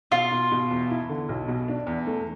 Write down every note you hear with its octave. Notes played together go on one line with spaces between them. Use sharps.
B2 F4
B2
B2
E2
E4
D3
B1
B2
D4
E2
A3